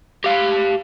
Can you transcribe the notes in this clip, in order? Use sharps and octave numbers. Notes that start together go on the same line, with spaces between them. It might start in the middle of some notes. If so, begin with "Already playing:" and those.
G4 F5